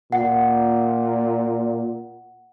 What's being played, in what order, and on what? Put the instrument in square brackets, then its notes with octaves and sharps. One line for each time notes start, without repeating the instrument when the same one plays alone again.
[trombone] A#2 [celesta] F#5